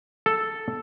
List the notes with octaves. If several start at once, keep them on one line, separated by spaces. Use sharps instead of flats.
A4